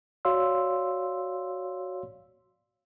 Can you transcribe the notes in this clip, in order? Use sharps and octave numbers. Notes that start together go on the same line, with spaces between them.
F#4 C#5 D5 F5 C6 E6